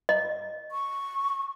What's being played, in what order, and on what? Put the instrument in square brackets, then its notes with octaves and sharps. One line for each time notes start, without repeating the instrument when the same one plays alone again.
[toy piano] D#5
[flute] C#6